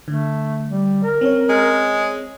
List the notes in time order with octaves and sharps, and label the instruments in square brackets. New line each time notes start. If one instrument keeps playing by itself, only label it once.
[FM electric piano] D3 [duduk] A3
[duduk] G3
A#4
[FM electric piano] C4 C#4 C#5
[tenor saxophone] G#3